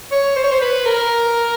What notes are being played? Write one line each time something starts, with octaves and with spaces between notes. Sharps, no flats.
C#5
C5
C#5
C5
B4
A#4